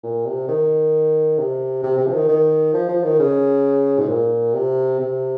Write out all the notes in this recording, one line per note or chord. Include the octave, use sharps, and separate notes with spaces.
A#2
C3
D#3
C3
C3
C3
F3
D#3
D#3
F3
F3
D#3
C#3
G#2
A#2
C3
C3